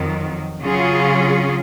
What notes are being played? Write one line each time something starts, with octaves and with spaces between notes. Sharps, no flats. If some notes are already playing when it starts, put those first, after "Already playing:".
Already playing: F2 D#3 F#3
C#3 F#3 C#4 F4 G#4